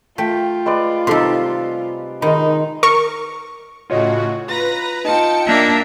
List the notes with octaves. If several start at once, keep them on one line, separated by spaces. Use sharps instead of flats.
A3 F4 G5
G#3 B4 D5
C3 G3 D#4 A4 C6
D#3 G#3 D#4 B5
A#4 C#6
A2 C#3 F4 F#4 C#5 D#5
F4 B4 A#5 A#6
D#4 F4 G5 A5 C#7
A#3 D4 E5